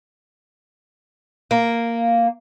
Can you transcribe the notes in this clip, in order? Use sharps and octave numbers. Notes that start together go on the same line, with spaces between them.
A#3